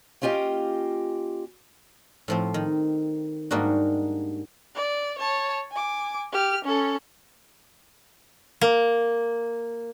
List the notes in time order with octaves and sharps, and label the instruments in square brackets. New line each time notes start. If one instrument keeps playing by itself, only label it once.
[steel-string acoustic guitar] A#3 C#4 F4 G4 D#5 G5
[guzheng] A2 F3 C4
D#3
G#2 G3 A#3 D4 D#4 F#4
[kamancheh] D5
C#5 A5
G#5 D6
G4 F6
C#4 A4
[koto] A#3